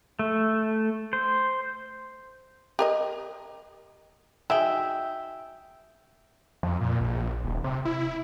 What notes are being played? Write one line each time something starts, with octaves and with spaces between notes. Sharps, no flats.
A3
C5
G4 A#4 D#5
F#3 D#4 G#4 E5 G5
F2
A#2
A#1
D#1
C3
E4